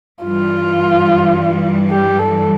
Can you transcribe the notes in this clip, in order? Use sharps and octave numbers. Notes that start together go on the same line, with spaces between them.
G2 E3 G3 F4
G4
A4